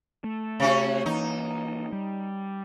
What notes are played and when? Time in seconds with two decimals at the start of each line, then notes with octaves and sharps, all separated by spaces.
0.24 A3
0.60 C3 C#4 F#4
1.06 E3 A#3 D#4
1.93 G3